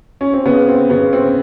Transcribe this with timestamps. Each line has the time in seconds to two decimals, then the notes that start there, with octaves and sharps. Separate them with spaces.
0.21 C#4
0.34 C4
0.45 C#3 B3
0.68 C4
0.90 C#3 B3
1.13 C4